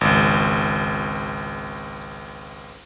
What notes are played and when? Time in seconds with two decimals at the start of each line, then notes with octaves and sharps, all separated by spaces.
0.01 G#1 C#2